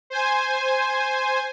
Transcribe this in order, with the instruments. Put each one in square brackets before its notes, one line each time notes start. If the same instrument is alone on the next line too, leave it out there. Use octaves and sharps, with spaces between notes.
[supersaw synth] C5 G#5